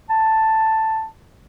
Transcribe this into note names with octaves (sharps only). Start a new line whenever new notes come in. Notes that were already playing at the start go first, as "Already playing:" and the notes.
A5